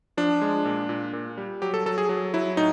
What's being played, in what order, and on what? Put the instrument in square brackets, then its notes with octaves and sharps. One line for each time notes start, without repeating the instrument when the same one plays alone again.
[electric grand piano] F3 D4
G#3
A#2
A#2
A#2
G3
F#3 G4
A4
F#3 A4
G#4
F#3
F#3 E4
A2 D#4